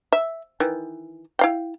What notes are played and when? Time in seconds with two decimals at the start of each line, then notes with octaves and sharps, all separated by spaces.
0.12 E5
0.60 D#3 E3
1.39 E4 F5 G5